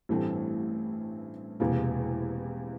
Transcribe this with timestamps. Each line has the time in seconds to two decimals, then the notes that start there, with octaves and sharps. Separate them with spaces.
0.09 A1 G2 E3 A3 C4
1.60 E1 E2 C3 E3 A#3